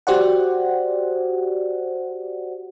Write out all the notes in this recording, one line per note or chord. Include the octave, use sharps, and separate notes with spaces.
F#4 G4 C5 D5 F#5